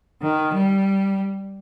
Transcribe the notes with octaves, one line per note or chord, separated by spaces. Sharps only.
D#3
G3